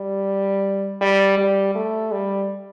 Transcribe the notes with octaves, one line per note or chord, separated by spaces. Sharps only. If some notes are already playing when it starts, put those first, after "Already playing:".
Already playing: G3
G3
G3
A3
G3